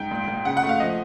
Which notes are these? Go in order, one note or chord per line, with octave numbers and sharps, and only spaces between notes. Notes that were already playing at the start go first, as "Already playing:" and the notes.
Already playing: G#2 G5
A#2
A#2
C#3 F#5
F#5
A3
F5
F3 D#5